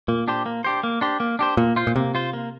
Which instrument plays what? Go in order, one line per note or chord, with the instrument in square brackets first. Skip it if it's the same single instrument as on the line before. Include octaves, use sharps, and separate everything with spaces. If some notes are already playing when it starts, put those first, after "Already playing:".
[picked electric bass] A#2 [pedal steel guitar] A#3
[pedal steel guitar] D4 G4 C5
A#3
D4 G4 C5
A#3
D4 G4 C5
A#3
D4 G4 C5
[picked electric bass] A#2 [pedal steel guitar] A#3
[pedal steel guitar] F4 C5
[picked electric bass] A#2
[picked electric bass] C3 [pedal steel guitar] A#3
[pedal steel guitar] F4 C5
A#3